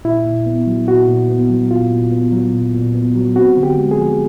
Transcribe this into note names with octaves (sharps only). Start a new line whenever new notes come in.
A#2 E4
A#2
B3
F#3
A#2 F#4
A#2
B3
F#3
A#2 F4
A#2
B3
F#3
A#2
A#2
B3
F#3
C4 F#4
D3
G4
G#3
G#4
F3